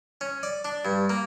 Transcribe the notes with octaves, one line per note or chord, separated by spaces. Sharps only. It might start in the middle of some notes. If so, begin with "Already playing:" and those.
C#4
D5
D4
G2
A#3